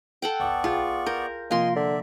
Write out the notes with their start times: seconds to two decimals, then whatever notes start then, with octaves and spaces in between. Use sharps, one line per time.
0.22 A4 F#5 G5
0.40 G#1 C#2 B3 D5 C#6
0.64 B1 F4 G#4 G5
1.06 A#4 G6
1.51 C3 F3 A#3 F4 A#4 D#5 G#5 C6
1.76 D3 D5 E5